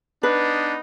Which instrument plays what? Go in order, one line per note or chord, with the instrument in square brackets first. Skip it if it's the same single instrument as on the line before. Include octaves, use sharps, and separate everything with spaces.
[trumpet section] B3 D#4 [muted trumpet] D4 [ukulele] B4